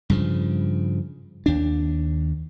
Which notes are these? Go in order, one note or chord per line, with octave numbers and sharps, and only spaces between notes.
G2 C#3 F3
D#2 D4